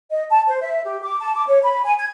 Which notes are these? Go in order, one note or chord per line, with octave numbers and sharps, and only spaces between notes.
D#5
A5
C5
E5
G4
D6
A5
D6
C#5
B5
G#5
G#6